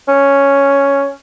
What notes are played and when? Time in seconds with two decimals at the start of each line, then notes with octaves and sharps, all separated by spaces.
0.08 C#4